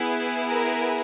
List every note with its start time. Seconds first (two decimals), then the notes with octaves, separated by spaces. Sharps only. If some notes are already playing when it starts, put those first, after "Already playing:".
Already playing: B3 E4 G#4
0.49 A#4